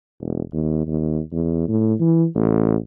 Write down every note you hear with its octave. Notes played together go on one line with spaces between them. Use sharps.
E1
D#2
D#2
E2
A2
E3
A1